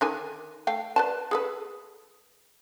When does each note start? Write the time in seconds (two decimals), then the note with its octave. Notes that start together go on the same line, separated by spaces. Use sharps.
0.01 D3 D#3 G#5
0.67 A3 F5 G5
0.96 B4 D5 A5
1.31 G#4 A4 B4